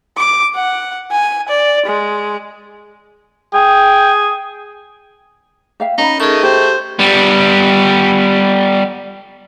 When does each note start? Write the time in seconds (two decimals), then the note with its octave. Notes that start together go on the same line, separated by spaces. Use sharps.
0.17 D6
0.56 F#5
1.11 G#5
1.49 D5
1.86 G#3
3.54 G#4 G5
5.80 E5 F5 G5
5.98 C#4 D#4 A#5 B5
6.20 D#3 A3 G#4 D#5 C#6
6.43 G4 C5
6.99 G3 B3